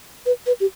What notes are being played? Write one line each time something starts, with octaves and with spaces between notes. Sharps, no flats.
B4
B4
G4